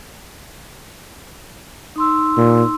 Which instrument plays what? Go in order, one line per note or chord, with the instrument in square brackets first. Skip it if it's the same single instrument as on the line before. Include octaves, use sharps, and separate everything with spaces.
[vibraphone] D#4 C6 E6
[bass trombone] A#2